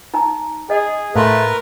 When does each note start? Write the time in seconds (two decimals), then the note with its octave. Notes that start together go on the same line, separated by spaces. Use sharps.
0.14 D#4 G#5 A#5
0.70 G#4 D#5
1.15 A2 A3 A#4 B4 F5 G#5 C6